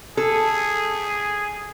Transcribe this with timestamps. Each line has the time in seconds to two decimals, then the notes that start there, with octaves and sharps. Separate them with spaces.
0.17 G#4 A4